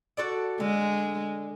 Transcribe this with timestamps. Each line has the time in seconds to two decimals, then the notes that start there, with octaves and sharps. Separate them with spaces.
0.17 F#4 A4 D5
0.60 D3 G#3